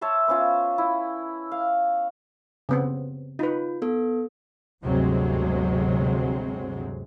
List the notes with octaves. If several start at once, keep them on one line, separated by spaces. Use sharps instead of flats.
C#5 E5 A5 C6
B3 C#4 F4
E4
F5
C#3 B3 C4
D#4 F4 B4
B3 A4
G1 D2 C3 F#3 G#3 C4